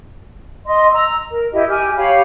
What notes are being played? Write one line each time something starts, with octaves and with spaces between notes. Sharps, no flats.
D#5 C6
A#5 E6
A#4
E4 G4 D#5
G4 G#5 F6
G4 C#5 F5 B5